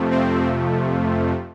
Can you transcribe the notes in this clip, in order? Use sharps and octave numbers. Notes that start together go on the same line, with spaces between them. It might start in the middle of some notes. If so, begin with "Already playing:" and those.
Already playing: F2 C3 F3 A3
C4